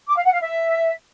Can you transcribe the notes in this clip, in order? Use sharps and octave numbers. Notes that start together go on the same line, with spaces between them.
D6
F5
F#5
F5
E5